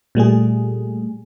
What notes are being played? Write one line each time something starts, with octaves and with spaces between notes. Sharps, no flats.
A#2 G3 A3 G#4